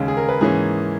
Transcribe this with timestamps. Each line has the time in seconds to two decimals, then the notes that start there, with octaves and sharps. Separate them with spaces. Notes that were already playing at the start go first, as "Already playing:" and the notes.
Already playing: D#2 C#3 G#3
0.08 G#4
0.17 A#4
0.29 B4
0.41 G#2 E3 A#3 C#4 G#4